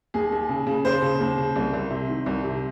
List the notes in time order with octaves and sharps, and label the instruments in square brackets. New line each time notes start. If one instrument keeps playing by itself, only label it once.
[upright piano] D#2 G#4
D#2
C#3
C#3
D#2 C5
C#3
D#2
C#3
C2
C2
C3
D#3
C2
C3